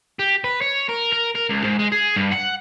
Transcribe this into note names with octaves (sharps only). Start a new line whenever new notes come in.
G4
B4
C#5
A#4
A#4
A#4
C#2
G#2
G#3
G#4
G2
F#5